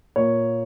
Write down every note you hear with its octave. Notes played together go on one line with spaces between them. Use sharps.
A#2 A#3 C#5